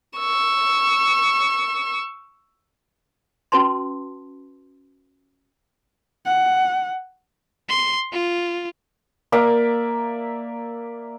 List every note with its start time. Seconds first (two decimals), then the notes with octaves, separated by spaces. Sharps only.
0.18 C#6 E6
3.52 C#4 F#4 B4 A5 C6
6.26 F#5
7.69 C6
8.13 F4
9.32 A#3 D5 E5